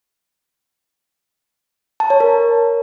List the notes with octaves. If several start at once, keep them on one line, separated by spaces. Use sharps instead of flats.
A5
C#5
A#4